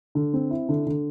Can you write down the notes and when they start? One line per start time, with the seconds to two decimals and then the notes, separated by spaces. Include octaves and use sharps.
0.15 D3
0.34 C4
0.51 E4
0.69 D3
0.87 D3